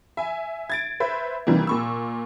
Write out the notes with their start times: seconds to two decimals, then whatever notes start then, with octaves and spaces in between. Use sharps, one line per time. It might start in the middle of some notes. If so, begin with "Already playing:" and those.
0.17 E5 G#5
0.70 G#6 A6 D7
1.00 B4 C5 E5
1.47 C3 D#3 E3 G3 A#3
1.67 A#2 C#6 E6